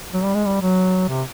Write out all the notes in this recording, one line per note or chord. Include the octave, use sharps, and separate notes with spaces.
F#3
G3
G#3
G3
F#3
C3